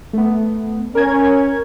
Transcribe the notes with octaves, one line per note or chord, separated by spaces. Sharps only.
A3 B3
C#4 A#4 G#6